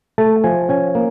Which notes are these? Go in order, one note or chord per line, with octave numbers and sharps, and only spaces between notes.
A3 A5
F3 G#5
C#4 G#5
A#3